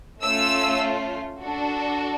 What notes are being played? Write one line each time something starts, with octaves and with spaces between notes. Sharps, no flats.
A3 C#4 F4 E6
D4 F#4 A4